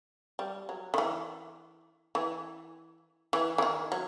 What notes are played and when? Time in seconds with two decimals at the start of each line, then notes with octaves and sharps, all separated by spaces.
0.39 G3
0.69 F#3
0.94 D#3
0.98 E3
2.15 E3
3.33 E3
3.58 E3
3.62 D#3
3.92 F#3